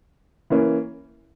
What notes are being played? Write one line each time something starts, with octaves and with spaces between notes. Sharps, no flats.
E3 A#3 C#4